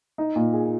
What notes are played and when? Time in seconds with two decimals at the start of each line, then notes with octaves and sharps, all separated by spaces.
0.18 D#4
0.36 A#2
0.53 G#4